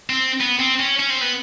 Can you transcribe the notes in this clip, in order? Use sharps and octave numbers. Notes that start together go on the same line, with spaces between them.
C4
B3
C4
C#4
C#4
C4
B3